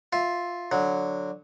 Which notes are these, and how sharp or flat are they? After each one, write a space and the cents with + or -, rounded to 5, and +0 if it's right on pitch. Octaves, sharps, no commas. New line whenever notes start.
F4 +5 E5 +0
D3 +0 F#3 -10